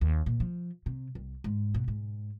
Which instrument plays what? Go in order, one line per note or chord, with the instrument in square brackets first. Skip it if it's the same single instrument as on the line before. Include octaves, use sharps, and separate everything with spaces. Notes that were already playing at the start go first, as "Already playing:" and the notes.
[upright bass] D#2
A#2
F3
C3
C2
G#2
B2
G#2